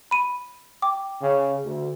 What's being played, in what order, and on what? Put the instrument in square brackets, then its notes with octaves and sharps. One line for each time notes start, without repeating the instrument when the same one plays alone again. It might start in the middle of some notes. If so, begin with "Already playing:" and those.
[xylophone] B5 D#7
G5 D6
[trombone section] C#3
D2